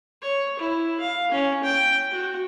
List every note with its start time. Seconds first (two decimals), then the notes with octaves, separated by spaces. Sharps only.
0.22 C#5
0.59 E4
1.00 F5
1.32 C#4
1.64 G5
2.12 F#4